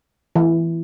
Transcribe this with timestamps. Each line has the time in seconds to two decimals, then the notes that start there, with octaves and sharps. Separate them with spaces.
0.35 E3